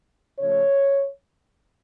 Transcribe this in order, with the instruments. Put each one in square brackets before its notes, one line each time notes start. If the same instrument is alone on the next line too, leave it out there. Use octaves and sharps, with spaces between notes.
[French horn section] C#3 F3 A3 C#5